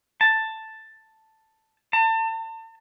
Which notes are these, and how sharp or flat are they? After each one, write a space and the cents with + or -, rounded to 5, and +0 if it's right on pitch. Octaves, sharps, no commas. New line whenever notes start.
A5 +5
A5 +35